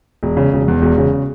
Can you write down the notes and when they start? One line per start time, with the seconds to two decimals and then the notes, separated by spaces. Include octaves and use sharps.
0.23 E1
0.37 C#3
0.53 E1
0.68 E2
0.82 E1
0.98 C#3